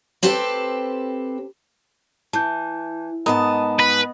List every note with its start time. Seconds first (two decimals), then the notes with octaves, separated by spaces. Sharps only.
0.23 C4 G4 A4 B4 C5
2.33 E3 A5 G6
3.26 G#2 B3 G#4 A#4 D#5 A5 A#5 D#6
3.79 B4